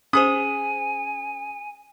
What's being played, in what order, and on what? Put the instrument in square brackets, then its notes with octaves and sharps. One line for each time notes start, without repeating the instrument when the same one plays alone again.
[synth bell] C#4 G#4 C5 [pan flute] G#5 [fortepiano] D#6